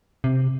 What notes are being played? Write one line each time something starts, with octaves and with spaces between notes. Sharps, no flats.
C3